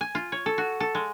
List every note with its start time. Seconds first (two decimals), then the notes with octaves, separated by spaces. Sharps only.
0.01 G#5
0.15 F4
0.32 C#5
0.46 A4
0.58 F#4
0.80 A4
0.95 G#3